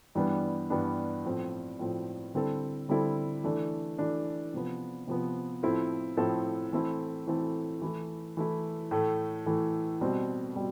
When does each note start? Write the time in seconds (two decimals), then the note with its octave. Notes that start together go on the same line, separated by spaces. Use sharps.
0.15 G2 E3 G3 B3 D4
0.70 G2 E3 G3 B3 D4
1.25 A2 F3 C4
1.79 A2 F3 C4
2.34 D3 G3 C4 E4 A4
2.89 D3 G3 C4 E4 A4
3.44 E3 A3 D4
3.98 E3 A3 D4
4.53 C3 F3 B3
5.08 C3 F3 B3
5.63 A2 F3 C4 E4 A4
6.17 A2 F3 C4 E4 A4
6.72 E3 A3 C4 E4 A4
7.27 E3 A3 C4 E4 A4
7.82 E3 A3 E4
8.37 E3 A3 E4
8.91 A2 E3 A3
9.46 A2 E3 A3
10.01 B2 G3 C4
10.56 B2 G3